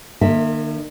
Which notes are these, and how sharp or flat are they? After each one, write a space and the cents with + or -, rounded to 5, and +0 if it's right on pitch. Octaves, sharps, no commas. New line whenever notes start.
D#3 -45 A#3 +0 E5 -10